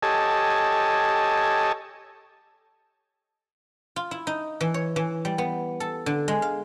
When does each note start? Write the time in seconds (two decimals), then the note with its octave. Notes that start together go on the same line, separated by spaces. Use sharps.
0.03 G4 A4 C#5 D#5 G#5 A5
3.96 F4
4.11 E4
4.27 D#4
4.61 E3
4.74 C#5
4.96 E3
5.25 G3
5.38 B3
5.80 A4
6.06 D3
6.28 G#3
6.42 F5